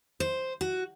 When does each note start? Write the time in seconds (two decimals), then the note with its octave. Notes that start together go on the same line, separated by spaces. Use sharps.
0.20 C5
0.61 F#4